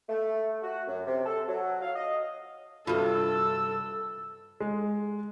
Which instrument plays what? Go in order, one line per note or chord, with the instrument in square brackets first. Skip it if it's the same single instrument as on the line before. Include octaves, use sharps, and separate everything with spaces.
[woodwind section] A3
F#4
F#2
C3
A4
F#3
F5
D#5
[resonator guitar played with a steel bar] G2 C3 [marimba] F4 F#4 [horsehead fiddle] A4 [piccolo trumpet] E6
[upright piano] G#3